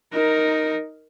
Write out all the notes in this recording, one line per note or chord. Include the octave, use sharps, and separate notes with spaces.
D#4 A#4